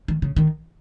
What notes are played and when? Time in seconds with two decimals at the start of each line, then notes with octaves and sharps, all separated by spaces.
0.08 D#3
0.22 C#3
0.36 D#3